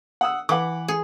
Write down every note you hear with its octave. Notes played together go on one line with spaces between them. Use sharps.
F#5 D#6 E6
E3 F#5 B5 D6
G#4